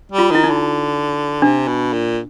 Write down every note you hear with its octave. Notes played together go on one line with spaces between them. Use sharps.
G3
F4
D#3 E4
D#4
D3
C3 D4
B2
A#2